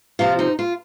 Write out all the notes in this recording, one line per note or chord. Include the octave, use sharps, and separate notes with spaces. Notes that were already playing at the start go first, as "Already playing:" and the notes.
C3 F3 C4 F4
D#4
F4